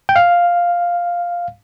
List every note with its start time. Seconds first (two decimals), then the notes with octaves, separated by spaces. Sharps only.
0.09 G5
0.16 F5